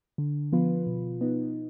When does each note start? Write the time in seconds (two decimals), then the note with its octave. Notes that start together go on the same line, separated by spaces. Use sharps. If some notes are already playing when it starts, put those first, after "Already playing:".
0.18 D3
0.52 F3 B3 F4 B4
0.87 B2
1.21 B3 D#4